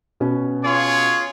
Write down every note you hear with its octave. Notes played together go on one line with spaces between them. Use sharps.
B2 B3 C#4
F4 G#4 C#5